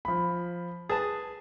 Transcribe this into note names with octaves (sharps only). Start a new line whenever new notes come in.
F3 B5
G#4 B4 A5 A6